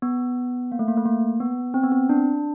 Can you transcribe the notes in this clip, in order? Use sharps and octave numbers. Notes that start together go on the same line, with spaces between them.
B3
A#3
A3
A#3
A3
A#3
B3
C4
B3
C4
D4